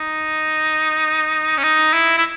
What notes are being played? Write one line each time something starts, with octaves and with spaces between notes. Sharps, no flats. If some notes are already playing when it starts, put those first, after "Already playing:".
Already playing: D#4
C#4
D#4
E4
E4